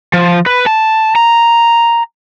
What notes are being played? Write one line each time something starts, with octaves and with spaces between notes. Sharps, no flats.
F3
B4
A5
A#5